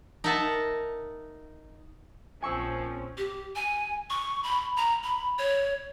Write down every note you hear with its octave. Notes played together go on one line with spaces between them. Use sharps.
D#4 A#4 D#5 E5 F#5 A5
A#1 F3 C4 C#4 G#5 C#6 E6
G4
G#5
C#6
B5
A#5
B5
C#5